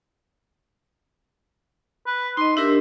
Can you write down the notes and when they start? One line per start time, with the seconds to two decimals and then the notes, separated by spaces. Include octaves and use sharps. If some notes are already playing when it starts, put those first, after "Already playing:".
2.07 B4
2.37 D#4 D#5 C6
2.57 D4 G4 A#4 E5